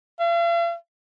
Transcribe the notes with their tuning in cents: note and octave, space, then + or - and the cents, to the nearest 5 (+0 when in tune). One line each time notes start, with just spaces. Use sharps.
F5 -45